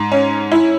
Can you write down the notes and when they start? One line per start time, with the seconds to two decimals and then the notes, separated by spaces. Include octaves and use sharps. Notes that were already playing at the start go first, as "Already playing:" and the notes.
Already playing: G#2
0.12 C#4
0.52 E4